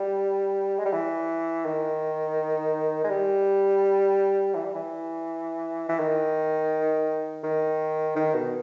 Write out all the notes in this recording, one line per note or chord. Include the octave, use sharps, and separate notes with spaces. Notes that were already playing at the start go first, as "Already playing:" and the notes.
Already playing: G3
G#3
G3
E3
D#3
G#3
G3
E3
G3
E3
E3
D#3
D#3
D#3
B2